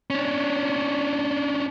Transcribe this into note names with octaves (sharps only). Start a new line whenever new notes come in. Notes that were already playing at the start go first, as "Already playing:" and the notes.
C#4 D4